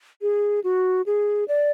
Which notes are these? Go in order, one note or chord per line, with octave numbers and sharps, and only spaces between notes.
G#4
F#4
G#4
D5